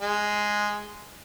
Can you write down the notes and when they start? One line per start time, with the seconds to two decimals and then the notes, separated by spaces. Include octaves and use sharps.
0.01 G#3